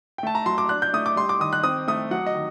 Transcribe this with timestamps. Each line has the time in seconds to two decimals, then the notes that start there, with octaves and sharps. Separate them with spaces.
0.18 G5
0.23 A3 A5
0.35 A#5
0.46 F#3 C6
0.58 D6
0.69 D4 F#6
0.82 G6
0.94 A3 D#6
1.06 D6
1.16 G3 C6
1.29 D6
1.40 D#3 D#6
1.53 F#6
1.64 C4 D#6
1.88 A3 D#6
2.11 F#3 F#5
2.26 D#5
2.34 D#3